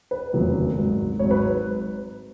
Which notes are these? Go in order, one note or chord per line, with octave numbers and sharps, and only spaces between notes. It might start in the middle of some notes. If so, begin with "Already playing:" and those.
B4
F1 D#2 C#3 F#3 B3
G#1 G#2 F#3
G#1 G#2 F#3 C#5
B4